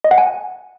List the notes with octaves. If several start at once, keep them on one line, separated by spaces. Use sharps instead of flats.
D#5
F#5
G#5